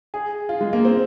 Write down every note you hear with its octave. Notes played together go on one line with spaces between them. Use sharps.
G#4
F4
G#3
A#3
C4